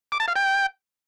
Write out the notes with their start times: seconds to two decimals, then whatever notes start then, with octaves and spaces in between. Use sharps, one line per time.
0.12 D6
0.20 A5
0.28 F5
0.36 G5